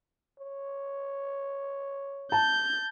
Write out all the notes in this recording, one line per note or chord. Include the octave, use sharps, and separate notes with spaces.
C#5
A5 G6